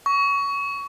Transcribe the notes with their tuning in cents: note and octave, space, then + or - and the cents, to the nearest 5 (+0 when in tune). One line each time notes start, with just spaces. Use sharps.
C#6 +20